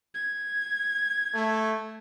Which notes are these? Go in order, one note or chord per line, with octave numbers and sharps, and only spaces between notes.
G#6
A3